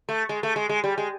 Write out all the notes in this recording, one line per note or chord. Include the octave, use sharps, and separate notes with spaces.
A3
G#3
A3
G#3
G#3
G3
G#3